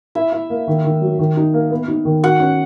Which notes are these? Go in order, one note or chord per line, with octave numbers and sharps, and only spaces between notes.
E4 E5
E4
A#3
D#3
D#3
F#3
D#3
D#4
A#3
B3
D#4
D#3
F#4 F#5
C#4